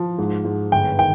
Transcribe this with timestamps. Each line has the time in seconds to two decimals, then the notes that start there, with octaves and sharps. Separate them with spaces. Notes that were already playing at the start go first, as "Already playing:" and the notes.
Already playing: F3
0.18 G#2
0.44 G#2
0.72 G1 G5
0.99 D#3 G5